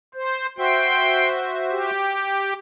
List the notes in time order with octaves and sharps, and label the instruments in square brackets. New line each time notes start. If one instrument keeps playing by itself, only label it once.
[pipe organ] C5
[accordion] F#4 C5 E5 [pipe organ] G5 C6
[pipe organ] G4